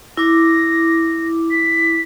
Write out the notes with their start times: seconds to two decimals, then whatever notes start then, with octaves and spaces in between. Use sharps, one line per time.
0.17 E4 D6 A#6
1.51 B6